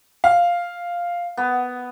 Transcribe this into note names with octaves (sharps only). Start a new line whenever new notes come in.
F5
B3